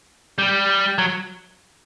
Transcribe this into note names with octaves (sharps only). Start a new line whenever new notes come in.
G3
F#3